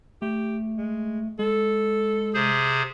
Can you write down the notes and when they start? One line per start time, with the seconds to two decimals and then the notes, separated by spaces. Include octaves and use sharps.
0.22 A3 G4
0.77 G#3
1.39 G#3 A4
2.34 C3 G#4 C5